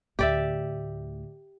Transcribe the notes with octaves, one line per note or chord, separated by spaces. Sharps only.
D2 A2 G4 D5 E5